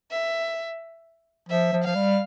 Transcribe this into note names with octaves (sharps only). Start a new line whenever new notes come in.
E5
F3 E5
F3
F3 F5
G3